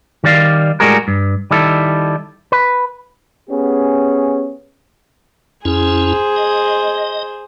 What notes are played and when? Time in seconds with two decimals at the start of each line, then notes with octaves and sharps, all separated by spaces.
0.24 D#3 G3 D5 F5
0.80 A2 G3 G#3 F#4 G#4 A#4
1.08 G2
1.51 D#3 G3 E4 A4
2.52 B4
3.49 B3 C#4 G4 G#4
5.65 F2 C#4 E4 G#4 C5
6.36 D#5